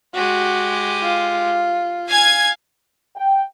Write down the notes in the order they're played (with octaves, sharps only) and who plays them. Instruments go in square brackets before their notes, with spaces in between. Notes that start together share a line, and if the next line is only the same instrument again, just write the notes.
[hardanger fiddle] G#3 G4 [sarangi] F#4
[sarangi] F4
[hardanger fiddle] F5 [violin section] G#5 G#6
[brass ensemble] G5